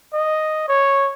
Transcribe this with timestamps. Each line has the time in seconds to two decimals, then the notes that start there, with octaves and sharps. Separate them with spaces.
0.14 D#5
0.68 C#5